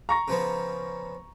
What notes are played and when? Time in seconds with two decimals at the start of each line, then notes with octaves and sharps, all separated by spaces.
0.09 A#5 C#6 A#6
0.28 C#3 F3 B3